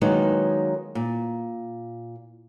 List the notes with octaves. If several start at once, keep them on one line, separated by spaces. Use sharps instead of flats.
D#3 F#3 G#3 A#3 B3 D#4
A#2